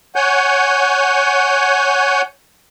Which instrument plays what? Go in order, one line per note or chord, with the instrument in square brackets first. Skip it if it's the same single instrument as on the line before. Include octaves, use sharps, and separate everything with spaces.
[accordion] C#5 F#5 G#5 G6